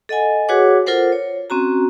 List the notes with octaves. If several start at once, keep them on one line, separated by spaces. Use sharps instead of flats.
A4 D#5 F#5 G#5
F#4 G#4 B4 C#5 F#5 D6
F4 A4 A#4 C5 F#5
C#5
C4 C#4 F#4 A#5